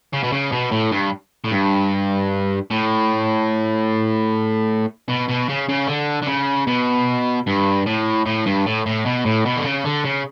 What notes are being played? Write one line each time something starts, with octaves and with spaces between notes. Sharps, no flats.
C#3
B2
C#3
B2
A2
G2
A2
G2
A2
B2
B2
C#3
C#3
D3
D3
C#3
B2
G2
A2
A2
G2
A2
A2
B2
A2
B2
D3
C#3
D3
C#3